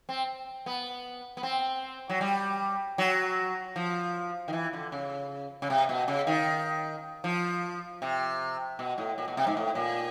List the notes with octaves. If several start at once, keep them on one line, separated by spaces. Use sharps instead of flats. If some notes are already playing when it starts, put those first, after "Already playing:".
C4
B3
B3
C4
F#3
G3
F#3
F3
D#3
E3
D3
C#3
C#3
C3
B2
C#3
D#3
F3
C3
B2
A2
A#2
B2
C3
G#2
A2
A#2